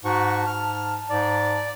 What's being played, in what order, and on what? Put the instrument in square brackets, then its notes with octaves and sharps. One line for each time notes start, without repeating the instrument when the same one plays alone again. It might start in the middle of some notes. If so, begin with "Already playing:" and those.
[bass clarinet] G#2 [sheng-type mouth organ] F#4 C#6 [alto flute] A5
[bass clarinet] G#2 [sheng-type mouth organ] F6
[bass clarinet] G#2 [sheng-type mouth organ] D5